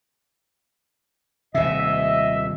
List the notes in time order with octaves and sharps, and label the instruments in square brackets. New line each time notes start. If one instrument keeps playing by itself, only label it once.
[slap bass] D#1 C3 [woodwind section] D#5 [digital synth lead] E5